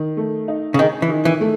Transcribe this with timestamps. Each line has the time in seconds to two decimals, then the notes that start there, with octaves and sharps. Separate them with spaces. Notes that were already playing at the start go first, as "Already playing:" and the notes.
Already playing: D#3
0.17 A3
0.48 D#4
0.74 C#3
0.79 D#3 G#4
1.02 E3
1.09 D#3
1.25 E3
1.41 A3